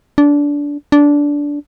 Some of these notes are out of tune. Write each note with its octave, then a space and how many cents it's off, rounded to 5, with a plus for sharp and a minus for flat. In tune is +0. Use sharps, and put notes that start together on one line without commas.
D4 -20
D4 -15